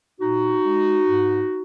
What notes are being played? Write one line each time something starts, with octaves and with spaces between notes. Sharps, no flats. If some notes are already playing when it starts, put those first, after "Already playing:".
A#2 D#4 F#4
G#3
G#2